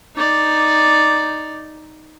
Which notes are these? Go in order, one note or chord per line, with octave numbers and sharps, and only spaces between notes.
D#4 D5